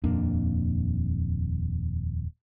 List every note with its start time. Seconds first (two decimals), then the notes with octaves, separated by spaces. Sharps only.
0.04 D#1 F2 A#3 D4